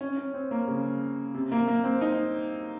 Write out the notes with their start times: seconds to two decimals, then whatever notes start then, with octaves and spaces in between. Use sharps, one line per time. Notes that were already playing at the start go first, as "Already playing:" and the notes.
0.01 C#4
0.17 C#4
0.34 C4
0.51 A#3
0.68 C#3
1.34 C3
1.52 A#3
1.68 A#3
1.84 C4
2.01 D#4